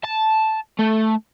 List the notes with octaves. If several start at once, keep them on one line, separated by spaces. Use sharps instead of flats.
A5
A3